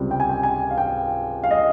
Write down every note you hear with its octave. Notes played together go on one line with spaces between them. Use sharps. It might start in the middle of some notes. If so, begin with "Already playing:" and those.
Already playing: C#2 C3 G3
G5
G#5
G5
G#5
F5
G5
F5
D#5